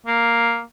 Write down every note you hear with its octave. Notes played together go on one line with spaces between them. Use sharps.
A#3